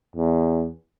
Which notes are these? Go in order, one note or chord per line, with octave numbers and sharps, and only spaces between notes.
E2